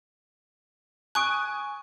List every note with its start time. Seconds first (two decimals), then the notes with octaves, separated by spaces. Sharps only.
1.15 G#5 C#6 D#6 F#6 D7